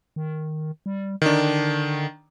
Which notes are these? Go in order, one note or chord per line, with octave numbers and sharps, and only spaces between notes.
D#3
G3
D3 D#3 D4